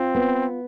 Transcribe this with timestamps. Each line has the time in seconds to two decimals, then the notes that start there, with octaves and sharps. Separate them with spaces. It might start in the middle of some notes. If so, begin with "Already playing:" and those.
Already playing: C4 F4
0.15 B3